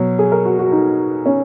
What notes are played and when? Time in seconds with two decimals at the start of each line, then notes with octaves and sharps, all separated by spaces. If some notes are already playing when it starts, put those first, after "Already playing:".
Already playing: B2 F#3
0.19 G#4
0.32 A#4
0.45 F#4
0.59 F#4
0.72 D#4
1.26 C#4